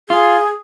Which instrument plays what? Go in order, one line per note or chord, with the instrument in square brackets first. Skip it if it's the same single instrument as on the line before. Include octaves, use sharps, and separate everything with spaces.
[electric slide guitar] F4 [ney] G#4